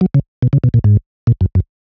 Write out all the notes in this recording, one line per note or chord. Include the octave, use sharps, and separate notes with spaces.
F#3
C#3
B2
C#3
B2
A#2
G#2
A#2
F#2
F#2